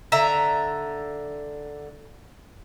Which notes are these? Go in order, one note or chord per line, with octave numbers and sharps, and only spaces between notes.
D3 E5 A#5